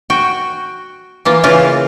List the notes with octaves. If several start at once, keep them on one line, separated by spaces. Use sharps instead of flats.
F#4 G5
E3 A#3 F4
C#3 E3 E4 F4